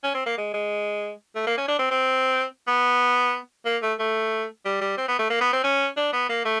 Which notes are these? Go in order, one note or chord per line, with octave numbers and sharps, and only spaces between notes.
C#4
C4
A#3
G#3
G#3
A3
A#3
C#4
D4
C4
C4
B3
A#3
A3
A3
G3
G3
C4
B3
A3
A#3
B3
C4
C#4
D4
B3
A#3
A3